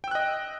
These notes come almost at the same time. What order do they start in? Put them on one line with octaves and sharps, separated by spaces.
G5 E6 F#6 D#5